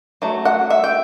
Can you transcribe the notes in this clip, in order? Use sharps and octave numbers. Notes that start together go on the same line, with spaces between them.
F#3 A3
F#5
E5
G5